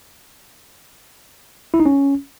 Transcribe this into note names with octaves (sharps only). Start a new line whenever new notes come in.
E4
D#4
C#4